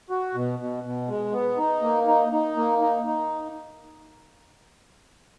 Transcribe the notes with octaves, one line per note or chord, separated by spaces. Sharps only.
F#4
B2
B2
B2
G#3
B3
D#4
A#3
D#4
D#4
A#3
D#4
D#4